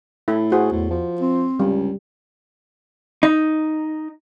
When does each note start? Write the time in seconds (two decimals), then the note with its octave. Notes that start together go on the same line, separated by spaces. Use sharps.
0.28 A2 E4 A4
0.52 F#4 G#4 C5
0.72 E2 A2
0.91 F3
1.21 C4
1.60 C#2 G3
3.23 D#4